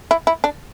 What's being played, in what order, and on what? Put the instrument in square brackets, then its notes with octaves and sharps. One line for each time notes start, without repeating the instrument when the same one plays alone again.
[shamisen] E4
E4
D4